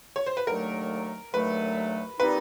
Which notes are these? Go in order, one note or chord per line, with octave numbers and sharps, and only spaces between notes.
C#5
C5
B4
D#2 D3 F#3 A3 A#4
D#2 D3 F#3 A3 B4
A#2 G3 C4 D#4 B4